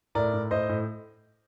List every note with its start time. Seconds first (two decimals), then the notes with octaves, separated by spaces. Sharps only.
0.15 A2 A#4 D5
0.33 A2
0.51 A2 C5 D#5
0.69 A2